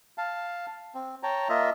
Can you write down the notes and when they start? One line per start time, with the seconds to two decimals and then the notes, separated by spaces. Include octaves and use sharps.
0.18 F5 A5
0.95 C4
1.23 C#5 G5 A5 A#5
1.49 A#3 F4 D#5 E5